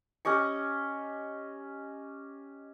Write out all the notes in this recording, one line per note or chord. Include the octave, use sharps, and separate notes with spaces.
C#4 G4 D#5 C#6